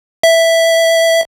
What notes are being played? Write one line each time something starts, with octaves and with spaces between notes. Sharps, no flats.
E5